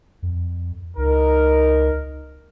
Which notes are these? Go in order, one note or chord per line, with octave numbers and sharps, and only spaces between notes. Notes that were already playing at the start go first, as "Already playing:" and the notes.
F2
C#2 D#4 A#4